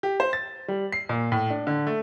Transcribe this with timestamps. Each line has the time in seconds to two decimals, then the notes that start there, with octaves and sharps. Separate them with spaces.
0.03 G4
0.20 C5
0.33 A6
0.68 G3
0.92 C7
1.09 A#2
1.32 A2
1.50 D4
1.67 D3
1.87 A3